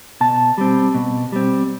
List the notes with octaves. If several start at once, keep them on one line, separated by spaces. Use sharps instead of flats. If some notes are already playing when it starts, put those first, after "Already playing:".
B2 A5
G3 C4
B2
G3 C4